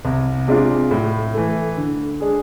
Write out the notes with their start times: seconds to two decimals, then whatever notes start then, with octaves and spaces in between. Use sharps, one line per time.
0.05 C2
0.48 C3 G#3 D4 F4
0.91 A2
1.34 E3 A3
1.77 D3
2.21 G#3 D4 G#4